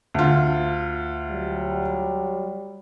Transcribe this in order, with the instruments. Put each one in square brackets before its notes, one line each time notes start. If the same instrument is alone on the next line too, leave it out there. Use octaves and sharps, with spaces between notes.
[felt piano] D2 F4
[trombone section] F#3 G3